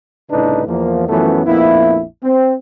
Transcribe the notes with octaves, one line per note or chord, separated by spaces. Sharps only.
C2 A2 C#3 D4 D#4 B4
E2 F3 A#3
F#2 E3 F3 A3 B3 C#4
A#1 F2 A#3 B3 E4
C4